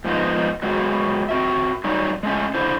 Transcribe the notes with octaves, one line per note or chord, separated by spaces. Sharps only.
G#2 F3 B3 D#4
F#3 G#3 B3 F4 F#4 G#4
C4 F#4 E5
F#3 G3 C#4 D#4
G#3 A3 C#4
D3 E4 C5